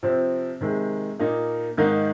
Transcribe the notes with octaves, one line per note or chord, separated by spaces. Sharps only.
C3 F3 C4
C3 D#3 G#3
A#2 A#3 D#4
G#2 D#3 A#3 D#4